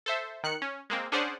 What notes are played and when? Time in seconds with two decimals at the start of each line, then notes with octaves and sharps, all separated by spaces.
0.06 A4 C5 E5
0.44 D#3 F#6 C#7
0.62 C#4
0.90 G#3 A#3 C4
1.12 C#4 D4 G#4 C5 D5 F#5